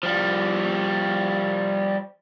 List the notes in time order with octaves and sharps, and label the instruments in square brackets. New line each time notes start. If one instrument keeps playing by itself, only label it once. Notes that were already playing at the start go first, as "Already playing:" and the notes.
[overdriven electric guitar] F3 G3